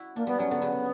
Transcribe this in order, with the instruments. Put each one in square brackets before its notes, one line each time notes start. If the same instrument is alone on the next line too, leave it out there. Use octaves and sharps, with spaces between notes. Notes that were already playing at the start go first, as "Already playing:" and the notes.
Already playing: [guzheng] E4 F#4
[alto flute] A#3 [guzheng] D4
[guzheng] G3 [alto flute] B3
[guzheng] F#3 [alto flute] C#4
[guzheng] D3 [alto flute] B3
[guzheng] C#3